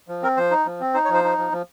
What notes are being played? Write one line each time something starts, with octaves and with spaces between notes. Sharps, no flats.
F3
C4 A#4
F3 C5
D#4
F3
C4
D#4 C5
C#5
F3 C5
D#4
F3
F3